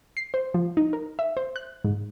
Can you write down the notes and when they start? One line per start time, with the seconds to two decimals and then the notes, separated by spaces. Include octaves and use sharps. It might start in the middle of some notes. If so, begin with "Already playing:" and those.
0.17 C7
0.34 C5
0.54 F3
0.77 D#4
0.93 A#4
1.19 E5
1.37 C5
1.56 F#6
1.84 G#2